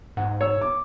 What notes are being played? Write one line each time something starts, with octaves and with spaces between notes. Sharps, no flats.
G#2 F#5
C#5 E6
D6